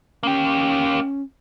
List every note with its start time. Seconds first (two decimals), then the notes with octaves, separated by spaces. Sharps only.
0.23 A#3 C#4 G4